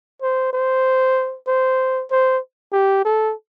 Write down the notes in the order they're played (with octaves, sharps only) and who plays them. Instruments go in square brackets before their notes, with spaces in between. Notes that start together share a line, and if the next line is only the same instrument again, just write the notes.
[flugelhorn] C5
C5
C5
C5
G4
A4